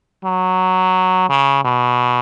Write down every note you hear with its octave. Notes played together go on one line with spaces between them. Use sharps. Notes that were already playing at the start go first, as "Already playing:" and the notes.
F#3
C#3
B2